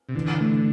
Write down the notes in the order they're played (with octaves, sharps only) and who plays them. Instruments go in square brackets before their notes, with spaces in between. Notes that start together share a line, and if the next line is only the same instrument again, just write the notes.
[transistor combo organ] C3
[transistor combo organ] D3 [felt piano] E3
[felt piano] A3